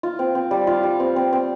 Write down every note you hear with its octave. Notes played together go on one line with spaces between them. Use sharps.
F4
C4
C4
G3
F4
G3
C4
C4
C4